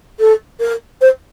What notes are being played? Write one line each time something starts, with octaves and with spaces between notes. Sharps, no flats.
A4
A#4
C5